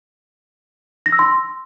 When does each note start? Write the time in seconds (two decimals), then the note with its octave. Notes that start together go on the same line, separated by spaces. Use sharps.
1.06 A#6
1.12 E6
1.19 C6